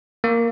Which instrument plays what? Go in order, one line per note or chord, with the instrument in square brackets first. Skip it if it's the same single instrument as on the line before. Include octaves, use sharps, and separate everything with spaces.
[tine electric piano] A#3